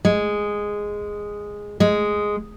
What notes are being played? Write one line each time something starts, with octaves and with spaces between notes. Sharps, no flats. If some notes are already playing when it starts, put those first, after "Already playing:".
G#3
G#3